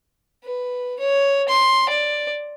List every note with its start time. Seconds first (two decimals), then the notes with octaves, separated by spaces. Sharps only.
0.44 B4
1.00 C#5
1.49 C6
1.89 D5